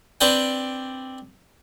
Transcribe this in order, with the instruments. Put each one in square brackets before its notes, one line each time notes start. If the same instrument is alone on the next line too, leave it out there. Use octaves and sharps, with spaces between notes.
[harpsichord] C4 D4 B4 D5 G5